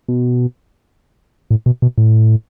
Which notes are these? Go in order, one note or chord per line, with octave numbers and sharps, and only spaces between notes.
B2
A2
B2
B2
A2